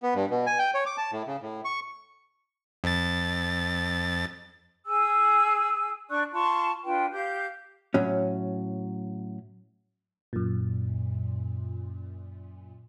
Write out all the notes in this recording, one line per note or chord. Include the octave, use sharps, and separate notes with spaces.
B3
G2
B2
G#5
G5
C#5
D6
A5
A2
C#3
A2
C#6
F2 A6
G#4 G#5 E6
D4 D5 C#6 F#6
F4 A5 C6 C#6
D4 F4 B4 G5
G4 F5 G6
A2 F#3 C#4
F#2 A#2